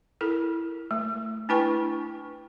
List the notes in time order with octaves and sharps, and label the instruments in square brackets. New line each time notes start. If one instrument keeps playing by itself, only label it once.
[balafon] E4 A4 A#4
A3
D4 E4 B4 G5 C#6